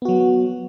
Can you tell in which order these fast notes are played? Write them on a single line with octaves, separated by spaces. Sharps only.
B3 F#4 F#3